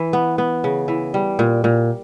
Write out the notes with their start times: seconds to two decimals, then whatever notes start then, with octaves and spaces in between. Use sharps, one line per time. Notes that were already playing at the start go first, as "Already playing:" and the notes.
Already playing: E3
0.13 B3
0.38 B3
0.64 C#3
0.88 E3
1.14 G3
1.39 A#2
1.64 A#2